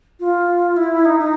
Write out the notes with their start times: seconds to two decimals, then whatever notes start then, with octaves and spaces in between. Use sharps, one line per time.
0.20 F4
0.77 E4
1.05 D#4
1.20 D#4